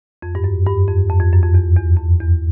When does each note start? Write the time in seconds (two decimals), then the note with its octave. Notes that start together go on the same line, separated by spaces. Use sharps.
0.22 F2
0.35 G2
0.44 F#2
0.66 G2
0.88 F2
1.10 F2
1.20 F2
1.33 F#2
1.43 F2
1.54 E2
1.76 E2
1.97 F2
2.20 E2